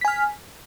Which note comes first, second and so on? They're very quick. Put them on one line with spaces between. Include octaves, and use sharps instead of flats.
B6 G#5 F6